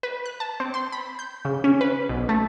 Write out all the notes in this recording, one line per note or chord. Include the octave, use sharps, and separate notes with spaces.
B4
F#6
A5
C4
C6
B5
G6
C#3
C#4
B4
B1
A3